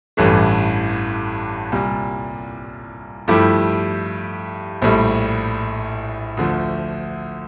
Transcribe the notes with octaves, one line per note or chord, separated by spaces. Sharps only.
A1 G2 E3 A3
C2 A#2 G3
G2 F3 A3 E4 G4
A#1 A2 G3
D2 D3 F3 A3